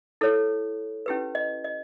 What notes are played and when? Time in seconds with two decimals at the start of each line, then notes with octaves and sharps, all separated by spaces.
0.21 E4 A4 C#5
1.06 C#4 E4 G4 B4
1.35 D#5
1.64 D#5